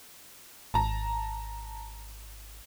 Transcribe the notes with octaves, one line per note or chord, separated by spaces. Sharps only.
G#1 A5 A#5